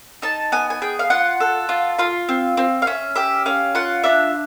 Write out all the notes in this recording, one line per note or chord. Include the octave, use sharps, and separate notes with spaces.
D#4 A5
B3 G#5
G#5
G#4 G5
F5
F4 F#5
A4
F4
F4 F5
C4
C4
F5
C#4 E5
G4 E5
C#4 F5
F4 F#5
D4 E5